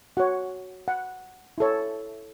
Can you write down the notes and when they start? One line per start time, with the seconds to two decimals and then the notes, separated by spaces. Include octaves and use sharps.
0.17 F#4 C#5 F#5
0.88 F#5
1.58 E4 A4 C#5